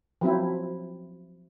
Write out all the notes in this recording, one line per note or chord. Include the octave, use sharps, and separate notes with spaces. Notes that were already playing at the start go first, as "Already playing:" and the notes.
F3 F#3 C4 E4